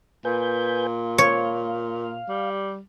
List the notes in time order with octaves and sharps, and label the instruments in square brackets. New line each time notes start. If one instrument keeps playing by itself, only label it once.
[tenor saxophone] A#2 [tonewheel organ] B4 G#5 G6
[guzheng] C#5 [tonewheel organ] F5
[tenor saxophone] G3